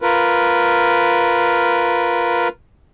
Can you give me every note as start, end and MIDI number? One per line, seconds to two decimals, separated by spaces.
0.02 2.48 65
0.02 2.48 70
0.02 2.48 71